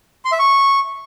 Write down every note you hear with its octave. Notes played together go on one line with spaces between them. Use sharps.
C6
E5
C#6